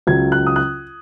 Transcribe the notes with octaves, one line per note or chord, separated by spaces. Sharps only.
C#2 C#3 F#3 G#6
F#6
D#6
F#6